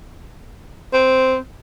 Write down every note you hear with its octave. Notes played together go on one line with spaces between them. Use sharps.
C4